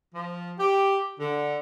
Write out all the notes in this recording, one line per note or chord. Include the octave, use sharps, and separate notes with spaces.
F3
G4
D3